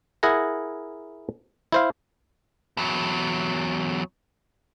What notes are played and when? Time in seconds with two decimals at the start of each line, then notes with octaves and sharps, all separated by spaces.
0.23 E4 G#4 A#4 F#5 A#5
1.72 E4 C5 F5
2.77 E2 F#3